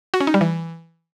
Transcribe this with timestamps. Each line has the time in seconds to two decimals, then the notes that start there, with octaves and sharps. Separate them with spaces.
0.14 F#4
0.20 C#4
0.27 D#4
0.34 G3
0.41 E3